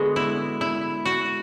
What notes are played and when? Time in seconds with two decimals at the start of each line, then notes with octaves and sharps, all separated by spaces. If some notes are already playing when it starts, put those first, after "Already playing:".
Already playing: D3 G#3 B3 F#4
0.16 E4
0.61 E4
1.05 F#4